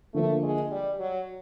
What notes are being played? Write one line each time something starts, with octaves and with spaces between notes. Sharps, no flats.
D3 F3 A3 A#3
G#3
G3
F#3